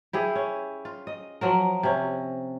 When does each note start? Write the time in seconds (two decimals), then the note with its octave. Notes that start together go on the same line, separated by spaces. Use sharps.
0.13 E4 G4 G#4
0.35 C#4
0.85 F4
1.07 D#5
1.41 F3 F#3 A#4
1.83 C3 C#4